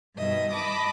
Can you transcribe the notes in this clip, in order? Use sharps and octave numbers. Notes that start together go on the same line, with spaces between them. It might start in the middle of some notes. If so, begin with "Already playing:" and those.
G2 B2 D#3 D#5 E5
D#5 A5 B5 D6 D#6